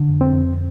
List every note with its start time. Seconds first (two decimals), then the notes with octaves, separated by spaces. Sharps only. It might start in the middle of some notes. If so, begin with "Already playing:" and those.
Already playing: D3
0.09 F2
0.21 C4
0.33 F2